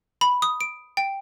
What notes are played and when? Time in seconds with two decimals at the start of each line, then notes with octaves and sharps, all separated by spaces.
0.21 B5
0.42 D#6
0.61 D7
0.97 G5